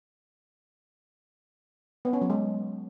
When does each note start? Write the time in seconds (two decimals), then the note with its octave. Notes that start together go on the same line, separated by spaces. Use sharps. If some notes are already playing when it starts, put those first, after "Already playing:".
2.05 B3
2.13 C#4
2.21 F#3
2.30 G#3